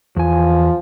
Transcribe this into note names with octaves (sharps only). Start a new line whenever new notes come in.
E2 F3 G#5